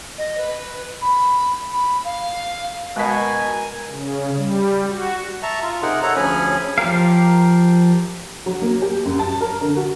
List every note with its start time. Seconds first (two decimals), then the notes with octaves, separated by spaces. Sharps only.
0.18 D#5
0.37 B4
1.01 B5
1.73 B5
2.04 F5
2.96 B2 G#3 A#4 D#5 G#5
3.90 C#3
4.36 G3
4.90 F#4
5.43 E5 A5 A#5 C#6
5.63 F4
5.83 C3 D#4 G#4 A#4 F#5
6.03 A4 C#5 F#5 A#5
6.16 D2 F3 C#4 G#4 G#5 B5
6.78 F3 G4 A#4 F5
8.46 F#3
8.62 A#3
8.82 G4
9.05 F#2
9.19 A5
9.41 A#4
9.61 D3
9.76 F#4